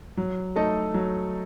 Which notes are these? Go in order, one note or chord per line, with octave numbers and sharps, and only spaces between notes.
F#3
A3 D#4 A4 D#5
F#3